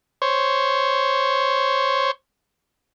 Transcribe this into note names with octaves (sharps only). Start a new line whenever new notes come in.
C5 C#5